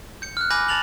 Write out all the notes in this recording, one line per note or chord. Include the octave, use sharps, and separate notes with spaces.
G6 C#7
F6 F#6
G#5 B5 D6 F#6 G6 A#6
A5 A6 F7 F#7